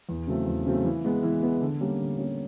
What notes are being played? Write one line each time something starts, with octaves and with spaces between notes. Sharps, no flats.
E2
C#3 F#3 A3 C4
E2
C#3 F#3 A3 C4
E3
G#3 B3
E3
G#3 B3
D3
G3 A#3 C#4
D3
G3 A#3 C#4